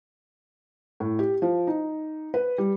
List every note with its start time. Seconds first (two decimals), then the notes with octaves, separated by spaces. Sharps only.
1.00 A2
1.19 G4
1.42 F3
1.67 D#4
2.34 B4
2.58 G3